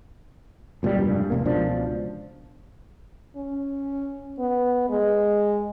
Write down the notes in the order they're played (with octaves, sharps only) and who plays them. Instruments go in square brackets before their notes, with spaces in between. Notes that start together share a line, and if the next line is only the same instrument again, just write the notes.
[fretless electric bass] C#2 A#2 F#3 G3
F1 G2
F1 C3 A#3
C#2 B2 F3 D4
[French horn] C#4
B3
G#3